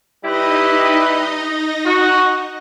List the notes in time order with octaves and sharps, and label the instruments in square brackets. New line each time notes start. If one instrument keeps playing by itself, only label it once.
[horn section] G3 E4 B4 [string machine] D#4 D#5
[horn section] F#4